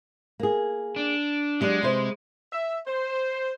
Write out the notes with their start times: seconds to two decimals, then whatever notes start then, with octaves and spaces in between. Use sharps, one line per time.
0.40 A#3 G#4
0.96 D4
1.61 F#3 G#3 D4 G4
1.83 C3 B4 C5
2.52 E5
2.87 C5